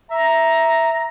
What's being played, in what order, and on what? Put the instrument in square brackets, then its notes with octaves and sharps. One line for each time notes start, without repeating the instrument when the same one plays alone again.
[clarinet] E5 [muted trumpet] A#5